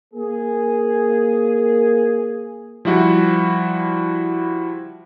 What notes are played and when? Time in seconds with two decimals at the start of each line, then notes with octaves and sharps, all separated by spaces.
0.14 A#3 G#4
2.85 F3 G3 E4 F#4